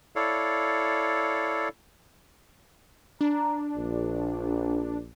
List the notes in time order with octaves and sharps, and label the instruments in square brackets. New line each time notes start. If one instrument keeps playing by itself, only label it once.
[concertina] E4 A4 C#5 D5 F5
[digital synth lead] D4 [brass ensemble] A#5
[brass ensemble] A#1